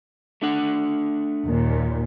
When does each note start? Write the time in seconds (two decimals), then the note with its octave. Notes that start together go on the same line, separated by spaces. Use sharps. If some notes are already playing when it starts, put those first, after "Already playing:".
0.42 A3 D4 F#5
1.45 D#2 A#2